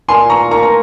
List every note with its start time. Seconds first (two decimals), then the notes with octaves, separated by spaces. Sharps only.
0.08 A#2 G#5 C6
0.30 A#5 C#6
0.51 A#3 A#5 C#6
0.63 A#5